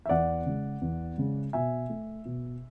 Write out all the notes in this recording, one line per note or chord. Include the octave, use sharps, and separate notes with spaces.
E5
E2 D5 F#5
C#3 G#3
E2
C#3 G#3
B2 E5 G#5
A3
B2